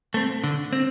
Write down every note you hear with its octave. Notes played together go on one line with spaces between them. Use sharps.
A3 C4
D3
C4